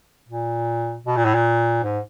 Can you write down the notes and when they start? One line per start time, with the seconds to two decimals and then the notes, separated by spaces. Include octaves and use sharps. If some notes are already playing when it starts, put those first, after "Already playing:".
0.28 A#2
1.07 B2
1.16 A#2
1.25 A2
1.34 A#2
1.83 G#2